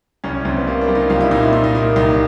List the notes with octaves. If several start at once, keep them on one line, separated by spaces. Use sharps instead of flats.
C2 C#4
C#4
C2 C4
B3
A#3
D4
G3
D#4
C2 F4
E4
A#2 D#4
E4
A#2 D#4
D#4
A#3
C2 D#4